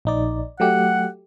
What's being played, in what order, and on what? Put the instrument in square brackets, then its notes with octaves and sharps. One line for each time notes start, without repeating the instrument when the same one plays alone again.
[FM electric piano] A#1 D#4 D5
[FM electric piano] F#3 A3 G4 [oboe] F#5